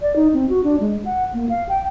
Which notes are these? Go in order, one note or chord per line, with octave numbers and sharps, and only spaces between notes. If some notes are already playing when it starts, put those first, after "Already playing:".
D5
D#4
C4
F#4
D4
G#3
F#5
A#3
F5
G5